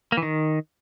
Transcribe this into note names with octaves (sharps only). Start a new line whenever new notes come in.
A#3
E3
D#3